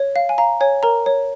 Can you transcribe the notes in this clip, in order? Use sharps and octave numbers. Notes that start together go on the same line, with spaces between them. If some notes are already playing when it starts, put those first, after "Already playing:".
Already playing: C#5
F5
G#5
F5 A#5
C#5 G#5
A#4 A#5
C#5